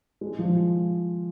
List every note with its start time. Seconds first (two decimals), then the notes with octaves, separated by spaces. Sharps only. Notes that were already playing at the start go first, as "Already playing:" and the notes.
0.21 G#3
0.39 F3